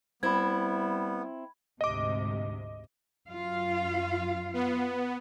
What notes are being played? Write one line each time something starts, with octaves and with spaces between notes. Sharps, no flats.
G3 B3 C4 E4 B5 G#6
D2 G#2 C3 D#5 D6
F#2 F4 F5
B3